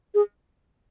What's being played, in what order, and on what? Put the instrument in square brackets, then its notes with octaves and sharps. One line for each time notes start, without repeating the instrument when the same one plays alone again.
[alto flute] G#4